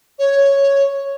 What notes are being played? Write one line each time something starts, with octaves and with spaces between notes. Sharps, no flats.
C#5